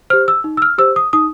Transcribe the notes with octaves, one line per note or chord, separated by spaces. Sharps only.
G4 C5 F6
E6
D#4
E6
F6
G4 C5 E6
D#6
D#4 D#6